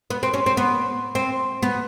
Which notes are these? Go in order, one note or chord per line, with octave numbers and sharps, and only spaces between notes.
B3
C4
C#4
C4
B3
C4
B3